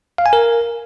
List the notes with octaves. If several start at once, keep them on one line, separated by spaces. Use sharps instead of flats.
F5
G#5
A#4